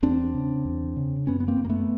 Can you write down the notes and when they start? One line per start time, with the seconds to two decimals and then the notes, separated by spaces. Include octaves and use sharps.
0.02 E2 C4 D4
0.34 C#3
0.65 E2
0.96 C#3
1.27 F#2 B3 C#4
1.40 B3
1.48 A#3 C4
1.58 F#2
1.65 A#3
1.70 A3 B3